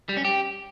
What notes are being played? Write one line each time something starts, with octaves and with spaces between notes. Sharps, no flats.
G3
C#4
G4